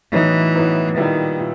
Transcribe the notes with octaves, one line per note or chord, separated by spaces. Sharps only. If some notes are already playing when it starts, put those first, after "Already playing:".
A2 E3 F#3 B3 D#4
A2 F#3 B3 D#4
A#2 D#3 G3 B3 E4
A#2